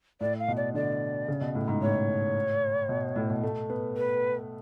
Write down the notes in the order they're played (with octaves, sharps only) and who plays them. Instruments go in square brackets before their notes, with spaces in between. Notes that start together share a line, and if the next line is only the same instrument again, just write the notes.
[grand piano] A2 [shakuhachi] D5
[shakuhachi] F5
[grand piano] B2
[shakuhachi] D5
[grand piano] D3 [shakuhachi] D5
[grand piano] C#3
B2
A2
G#2
[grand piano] A2 [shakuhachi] C#5
[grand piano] B2
A2
B2
A3
B3
[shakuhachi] B4